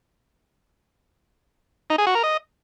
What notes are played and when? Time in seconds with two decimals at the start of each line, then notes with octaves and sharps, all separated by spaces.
1.90 D#4
1.98 G#4
2.07 F#4
2.15 A#4
2.23 D#5